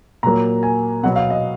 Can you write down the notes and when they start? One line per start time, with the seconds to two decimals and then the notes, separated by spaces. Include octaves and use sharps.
0.23 A#2 F#3 A#3 A#5
0.63 G#5
1.03 B2 F#3 B3 F#5
1.16 F5
1.30 D#5